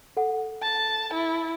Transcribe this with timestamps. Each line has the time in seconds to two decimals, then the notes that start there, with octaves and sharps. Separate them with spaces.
0.17 A4 F#5
0.62 A5
1.14 E4